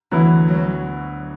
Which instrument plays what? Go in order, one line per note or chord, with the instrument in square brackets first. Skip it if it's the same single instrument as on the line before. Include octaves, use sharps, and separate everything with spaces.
[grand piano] D2 D3 F#3 B3 E4 [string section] E3
[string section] F#3